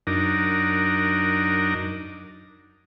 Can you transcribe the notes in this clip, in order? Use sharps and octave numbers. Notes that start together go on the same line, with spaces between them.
F#2 D4 D#4 A#4